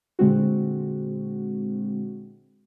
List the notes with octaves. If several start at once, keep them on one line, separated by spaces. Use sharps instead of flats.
A#2 D3 G#3 C4 F#4